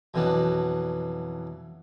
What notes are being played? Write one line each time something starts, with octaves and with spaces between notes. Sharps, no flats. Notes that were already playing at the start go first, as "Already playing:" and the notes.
F2 B2 E3 F#3 D4